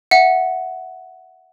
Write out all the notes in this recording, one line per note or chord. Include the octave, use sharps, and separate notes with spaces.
E5 F#5